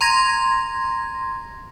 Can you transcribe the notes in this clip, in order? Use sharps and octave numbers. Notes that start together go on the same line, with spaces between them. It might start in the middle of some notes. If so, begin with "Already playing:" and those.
A#5 C6 G#6 A#6